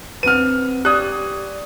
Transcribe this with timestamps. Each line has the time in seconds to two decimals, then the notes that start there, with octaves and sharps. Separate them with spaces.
0.23 C4 B4 F6 D#7
0.85 G4 D5 D#6 F#6 G#6